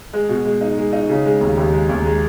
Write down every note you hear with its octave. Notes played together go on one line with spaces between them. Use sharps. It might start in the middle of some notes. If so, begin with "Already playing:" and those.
G#3
B2
G#3
D#4
G#3
D#4
C#3
G#3
D#2
D#2
G#3
D#2
G#3